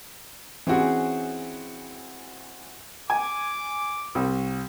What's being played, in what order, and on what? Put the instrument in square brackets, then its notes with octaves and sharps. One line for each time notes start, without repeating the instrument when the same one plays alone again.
[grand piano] E3 C4 C#4 F#4 G#4
[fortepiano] G#5 [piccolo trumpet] D6
[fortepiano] C2